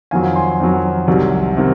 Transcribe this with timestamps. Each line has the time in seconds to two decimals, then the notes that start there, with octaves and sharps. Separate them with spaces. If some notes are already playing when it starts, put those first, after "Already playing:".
0.11 F2 D#3 F#3 F5 G#5
0.36 G#5 C6
0.60 F2 D#3 F#3
1.07 C2 C3 D#3 F#3
1.57 C3 D#3